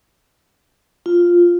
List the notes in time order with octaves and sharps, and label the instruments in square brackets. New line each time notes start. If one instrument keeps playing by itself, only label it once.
[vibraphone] F4